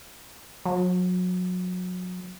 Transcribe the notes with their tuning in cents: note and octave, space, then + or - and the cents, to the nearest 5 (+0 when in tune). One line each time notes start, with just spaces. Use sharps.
F#3 -30